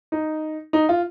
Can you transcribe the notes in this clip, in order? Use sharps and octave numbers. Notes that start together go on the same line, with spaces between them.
D#4
D#4
F4